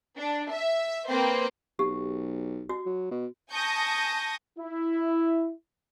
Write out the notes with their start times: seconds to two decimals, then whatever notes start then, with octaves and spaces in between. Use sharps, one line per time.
0.17 D4
0.51 E5
1.08 A#3 C4 B4 C5
1.79 B1 G4
2.69 F#4
2.86 F#3
3.11 B2
3.52 G#5 A5 C#6 D#6 G6 A#6
4.59 E4